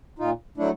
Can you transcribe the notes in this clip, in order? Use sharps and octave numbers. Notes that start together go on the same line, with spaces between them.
A#2 D#4 F4
F#3 A3 D4 E4